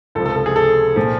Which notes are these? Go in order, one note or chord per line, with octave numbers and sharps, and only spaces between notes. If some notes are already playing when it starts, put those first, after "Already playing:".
C#2 C3 F3 A4
A4
A4
G#4
A4
A#2 F3